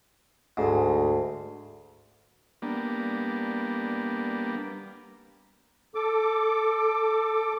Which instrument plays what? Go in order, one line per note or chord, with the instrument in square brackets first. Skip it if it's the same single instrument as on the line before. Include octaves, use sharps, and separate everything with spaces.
[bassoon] D2 [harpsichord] G#2
[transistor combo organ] G3 A#3 B3 D4
[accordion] A4 D6